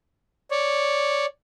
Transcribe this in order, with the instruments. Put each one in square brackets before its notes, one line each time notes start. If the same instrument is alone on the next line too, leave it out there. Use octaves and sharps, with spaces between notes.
[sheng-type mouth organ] C#5 D5